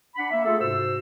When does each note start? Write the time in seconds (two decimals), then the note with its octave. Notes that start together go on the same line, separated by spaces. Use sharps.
0.16 D4 F#5 B5
0.30 A#3 E5
0.45 A3 F4 G#4 A4
0.60 G#2 C3 F#4 C5 E6